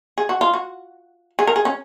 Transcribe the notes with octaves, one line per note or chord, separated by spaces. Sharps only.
G#4
F#4
F4
F#4
G#4
A#4
G#4
C#4